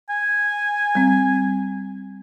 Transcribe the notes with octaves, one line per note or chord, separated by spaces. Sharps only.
G#5
G3 C4